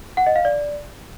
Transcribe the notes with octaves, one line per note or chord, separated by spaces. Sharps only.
F#5
D#5
F5
D5